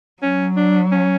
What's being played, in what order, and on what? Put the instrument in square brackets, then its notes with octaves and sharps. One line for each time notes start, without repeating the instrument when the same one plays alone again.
[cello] F#3 [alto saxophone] C#4
[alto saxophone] D4
C#4